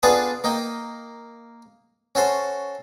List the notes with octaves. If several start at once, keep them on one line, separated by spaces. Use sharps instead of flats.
B3 D4 F4 G#4 A4 B4
A#3 D#4 G5
C#4 F#4 A4 C5